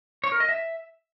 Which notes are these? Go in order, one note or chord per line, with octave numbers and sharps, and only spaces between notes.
C#5
A#4
D#5
E5